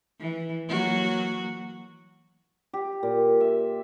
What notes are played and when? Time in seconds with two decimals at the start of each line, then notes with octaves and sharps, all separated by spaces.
0.20 E3
0.69 F#3 A#3 F#4
2.73 G4
3.03 A#2
3.40 E5